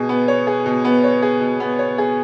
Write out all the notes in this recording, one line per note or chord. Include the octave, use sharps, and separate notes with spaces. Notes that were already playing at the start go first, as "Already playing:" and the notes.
Already playing: B2 G#4
B3
C#5
G#4
B2
B3
C#5
G#4
B2
B3
C#5
G#4